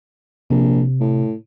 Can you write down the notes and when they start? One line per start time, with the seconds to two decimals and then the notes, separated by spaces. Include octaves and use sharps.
0.50 A#1 C3
1.00 A2